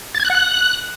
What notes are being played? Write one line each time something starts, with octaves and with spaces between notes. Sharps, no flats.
A6
G#6
F#6
F#5
F#6